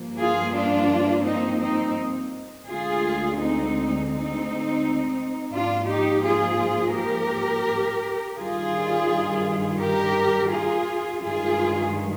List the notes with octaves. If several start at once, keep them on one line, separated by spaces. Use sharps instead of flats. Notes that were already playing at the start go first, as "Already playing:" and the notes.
Already playing: G2 F3 A#3
F4 G#4
D4 F4
C4 D#4
C4 D#4
D2 D3 G#3 F4 G#4
C4 D#4
C4 D#4
G#2 F3 A#3 D4 F4
D#4 G4
F4 G#4
G4 A#4
G2 D#3 G3 F4 G#4
G4 A#4
F4 G#4
G2 D#3 G#3 F4 G#4